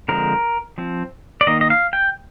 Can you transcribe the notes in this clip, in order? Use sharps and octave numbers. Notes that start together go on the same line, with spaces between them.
D3 F3 G#3 C4 A#4
F3 C4
D5
D#3 A#3 D#5
D#5
F5
G5